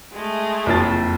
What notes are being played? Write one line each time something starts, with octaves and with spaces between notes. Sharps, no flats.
G#3 A3
F#1 F2 A6